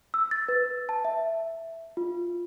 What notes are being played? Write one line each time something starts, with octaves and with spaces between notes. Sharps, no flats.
E6
A6
B4
A5
E5
F4